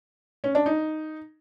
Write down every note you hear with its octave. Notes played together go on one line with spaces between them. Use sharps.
C#4
D4
D#4